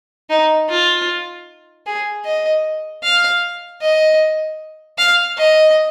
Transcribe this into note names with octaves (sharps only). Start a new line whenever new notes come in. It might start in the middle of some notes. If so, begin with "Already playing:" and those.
D#4
F4
G#4
D#5
F5
D#5
F5
D#5